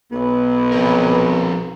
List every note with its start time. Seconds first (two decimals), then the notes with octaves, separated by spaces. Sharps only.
0.12 B1 B3
0.72 F3 C4 A#4